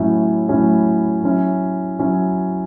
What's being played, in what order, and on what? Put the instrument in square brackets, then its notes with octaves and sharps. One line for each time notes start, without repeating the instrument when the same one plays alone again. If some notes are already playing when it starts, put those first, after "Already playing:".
Already playing: [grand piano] A2 F#3 C#4 E4
A2 F#3 C#4 E4
F#3 C#4 E4
F#3 C#4 E4